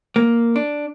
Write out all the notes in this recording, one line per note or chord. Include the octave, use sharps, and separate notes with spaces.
A#3
D4